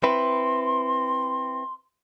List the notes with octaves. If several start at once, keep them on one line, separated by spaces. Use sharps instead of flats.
C4 E4 B4 C6